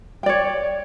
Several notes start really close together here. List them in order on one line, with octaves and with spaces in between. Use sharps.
G5 D5 C#5